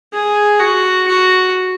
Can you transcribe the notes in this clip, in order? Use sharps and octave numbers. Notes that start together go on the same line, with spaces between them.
G#4
F#4
F#4